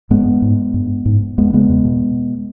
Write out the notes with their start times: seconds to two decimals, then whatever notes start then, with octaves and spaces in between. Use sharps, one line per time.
0.10 G2 G#3 B3
0.42 G#2
0.74 G2
1.06 G#2
1.38 E2 G#3 B3
1.54 C#3 G#3 B3
1.69 E2
1.85 B2